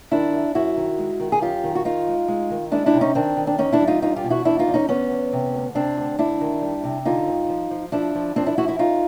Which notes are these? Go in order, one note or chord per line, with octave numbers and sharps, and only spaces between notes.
D#3 D4 E4
F#2
F#2 E4 F#4
D#3
G#3
D#3
G#4
F#2 F4 G4
D#3
F#4
D#3 D#4 F4
G#3
G#3
D#3
G#3 D4 E4
D4 E4
C3
C#4 D#4
D#3 C4 D4
D#3
D4
E2 C#4 D#4
D4 E4
G3
D#4 F4
E2 D#4 F4
F4 G4
B2
E4 F#4
E2 D4 E4
D#4 F4
E2
C#4 D#4
E2 B3 C#4
E2
C3
D2
C3 C4 D4
D2
D2 D4 E4
D#3
G3
C3
D3 D#4 F4
G2
F3
F3
F3 D4 E4
F3
F3 C4 D4
D4 E4
F3 E4 F#4
E4 F#4
F#2 D#4 F4